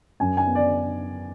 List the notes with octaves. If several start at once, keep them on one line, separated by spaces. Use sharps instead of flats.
F#2 G#5
G#5
B3
D5